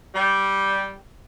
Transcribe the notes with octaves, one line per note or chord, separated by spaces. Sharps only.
G3